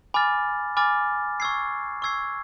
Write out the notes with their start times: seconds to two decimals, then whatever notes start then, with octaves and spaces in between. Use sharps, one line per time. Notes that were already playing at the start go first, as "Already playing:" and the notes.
0.14 G#5 B5 D6 F6 A6
0.77 G#5 B5 D6 F6 A6
1.40 C#6 E6 G#6 C7
2.02 C#6 E6 G#6 C7